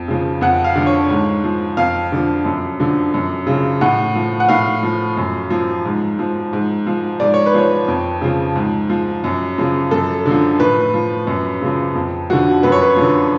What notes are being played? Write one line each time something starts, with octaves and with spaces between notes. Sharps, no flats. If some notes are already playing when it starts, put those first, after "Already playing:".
Already playing: F2
C#3 F3
F2 F#5
F5
D3 F3
C#5
G#2
F3
F2 F5
D3 F3
F#2
D3 F3
F#2
C#3 F3
A2 F#5
F3
F#5
A2 F5
F3
F#2
F3
G#2
F3
G#2
F3
G#2 D5
C#5
B4
F3 C#5
F2
C#3 F3
G#2
F3
F#2
C#3 F3
F#2 A4
D3
F3
A2 B4
F3
F#2
C#3 F3
F2
D3 F3 F#4
F#2 B4
C#5
B4
D3 F3